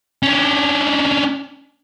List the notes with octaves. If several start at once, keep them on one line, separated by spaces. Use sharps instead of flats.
C#4 D4